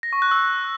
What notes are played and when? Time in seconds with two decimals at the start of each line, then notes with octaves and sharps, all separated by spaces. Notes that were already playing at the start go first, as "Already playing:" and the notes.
0.03 A#6
0.13 C#6
0.22 F#6
0.31 E6